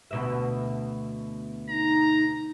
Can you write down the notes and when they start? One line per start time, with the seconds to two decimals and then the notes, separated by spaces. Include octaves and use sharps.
0.11 D2 B2 E5
1.69 D#4 A#5